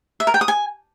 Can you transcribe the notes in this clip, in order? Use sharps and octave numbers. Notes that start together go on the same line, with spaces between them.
E5
A#4
G5
D#6
G#5